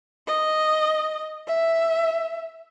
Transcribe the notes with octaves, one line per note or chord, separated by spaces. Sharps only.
D#5
E5